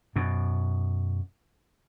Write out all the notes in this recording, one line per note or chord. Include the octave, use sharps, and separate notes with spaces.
F#2 B2